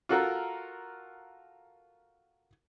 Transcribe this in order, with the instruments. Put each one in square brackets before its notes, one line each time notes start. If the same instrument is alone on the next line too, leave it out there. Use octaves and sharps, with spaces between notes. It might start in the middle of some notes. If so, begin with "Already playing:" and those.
[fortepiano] F4 F#4 A4 A#4